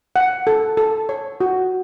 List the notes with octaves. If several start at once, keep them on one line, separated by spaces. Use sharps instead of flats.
F#5
A4
A4
C#5
F#4